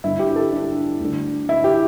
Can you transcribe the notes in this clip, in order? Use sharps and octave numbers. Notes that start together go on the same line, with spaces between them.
G1 G2 D3 E4
G4
A4
D4
D2 D3
E4
G4